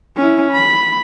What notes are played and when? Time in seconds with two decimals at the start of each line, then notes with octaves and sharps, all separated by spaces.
0.17 C#4 E4
0.52 B5